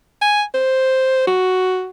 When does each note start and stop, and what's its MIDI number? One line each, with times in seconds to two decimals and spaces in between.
0.22 0.43 80
0.54 1.27 72
1.27 1.90 66